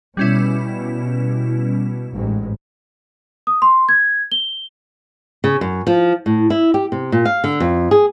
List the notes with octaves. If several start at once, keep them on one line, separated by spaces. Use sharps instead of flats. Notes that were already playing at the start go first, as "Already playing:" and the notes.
B2 G3 C#4 E4
A1 G#2
D#6
C6
G#6
G7
C#3
F#2
F3
A2
E4
G4
C3
A#2
F5
D3
F2
G#4